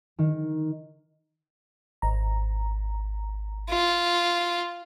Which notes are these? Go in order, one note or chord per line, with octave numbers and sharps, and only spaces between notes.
D#3
G#1 A#5
F4